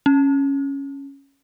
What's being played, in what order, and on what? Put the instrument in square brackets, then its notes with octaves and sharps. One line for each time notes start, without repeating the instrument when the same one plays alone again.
[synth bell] C#4